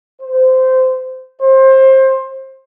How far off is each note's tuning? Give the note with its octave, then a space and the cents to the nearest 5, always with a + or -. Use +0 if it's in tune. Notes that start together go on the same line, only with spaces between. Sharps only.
C5 -15
C5 +25